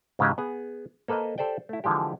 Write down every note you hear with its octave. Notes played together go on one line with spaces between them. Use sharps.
G#2 C#3 E3 G#3 G4 D#5
B3 G#4
A#3 A4 B4 C5 D#5
G4 A4 C5 D5 G5
A3 E4
D3 E3 F3 G#3 G4